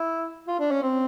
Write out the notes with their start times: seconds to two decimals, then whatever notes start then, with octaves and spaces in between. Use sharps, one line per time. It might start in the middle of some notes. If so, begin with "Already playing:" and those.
Already playing: E4
0.48 F4
0.59 D4
0.71 C#4
0.82 C4